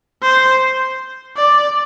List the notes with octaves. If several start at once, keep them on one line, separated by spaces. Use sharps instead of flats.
C5
D5